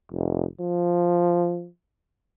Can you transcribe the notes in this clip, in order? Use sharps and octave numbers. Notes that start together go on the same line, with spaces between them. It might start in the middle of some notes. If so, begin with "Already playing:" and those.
F1
F3